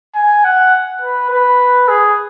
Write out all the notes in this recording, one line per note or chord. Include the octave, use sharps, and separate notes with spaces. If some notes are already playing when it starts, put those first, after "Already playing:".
G#5
F#5
B4
B4
G#4